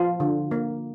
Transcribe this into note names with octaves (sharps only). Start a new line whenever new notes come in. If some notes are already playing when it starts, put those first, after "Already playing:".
Already playing: F3 F4
D3
A#3